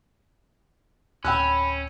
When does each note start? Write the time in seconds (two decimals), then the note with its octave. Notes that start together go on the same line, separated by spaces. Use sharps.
1.25 D1 C#4 G5 B5 E6 F#6